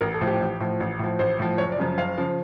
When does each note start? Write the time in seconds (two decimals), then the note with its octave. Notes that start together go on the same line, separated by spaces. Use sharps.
0.01 A1 A#4
0.14 A4
0.21 A2 F3
0.28 G4
0.40 A1
0.60 A2 F3
0.80 A1
0.99 A2 F3
1.19 A1 C5
1.39 A2 F3
1.58 F#1 C#5
1.72 D5
1.78 F#2 C#3 F3
1.98 F#1 F5
2.18 C#3 F3